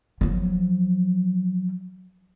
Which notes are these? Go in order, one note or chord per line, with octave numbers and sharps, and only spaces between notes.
F3 F#3